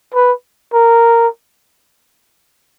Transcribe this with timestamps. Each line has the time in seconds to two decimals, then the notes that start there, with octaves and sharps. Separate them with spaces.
0.14 B4
0.74 A#4